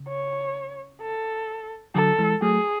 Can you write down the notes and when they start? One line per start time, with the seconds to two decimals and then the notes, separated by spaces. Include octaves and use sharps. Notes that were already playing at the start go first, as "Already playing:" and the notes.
Already playing: C#3
0.09 C#5
1.02 A4
1.95 D3 F#3 A4
2.19 E3 G#3
2.42 F#3 A3 G#4